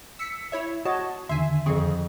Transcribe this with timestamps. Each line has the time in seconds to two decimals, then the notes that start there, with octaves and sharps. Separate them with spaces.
0.19 E6 B6 C#7
0.52 E4 C#5 E5
0.85 F#4 C#5 D#5 A5
1.29 E2 D3 D#3 E5 G#5 C6
1.66 F2 C4 G#4 C#6